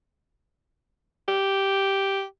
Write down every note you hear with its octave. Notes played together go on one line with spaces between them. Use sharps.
G4